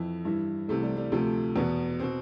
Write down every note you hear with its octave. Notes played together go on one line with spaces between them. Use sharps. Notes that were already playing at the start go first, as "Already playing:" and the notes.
Already playing: F2 E3 E4
G2 E3 E4
C2 C3 E3 A3
G3
G3
D2 C3 F3 A3
E2 B2 B3
B2 C4